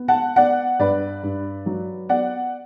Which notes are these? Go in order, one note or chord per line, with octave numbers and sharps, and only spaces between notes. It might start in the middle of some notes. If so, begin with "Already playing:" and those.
Already playing: B3
F#5 A5
B3 D5 F#5
G2 B4 D5
G2
F#3
B3 D5 F#5